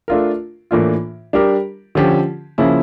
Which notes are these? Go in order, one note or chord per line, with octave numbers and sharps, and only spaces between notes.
A3 D4 F4 A#4
A2 E3 A#3 D4 F4
G3 D4 G4 A#4
D3 F3 C#4 G4
C#3 F3 A#3 C#4 E4